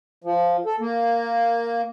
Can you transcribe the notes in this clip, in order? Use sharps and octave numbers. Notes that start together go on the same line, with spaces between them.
F3
A4
A#3